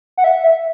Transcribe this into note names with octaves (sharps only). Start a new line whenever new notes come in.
F#5
E5
E5